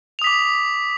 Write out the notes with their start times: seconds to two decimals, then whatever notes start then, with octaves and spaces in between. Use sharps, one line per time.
0.19 F7
0.22 D#6
0.24 B6
0.27 D6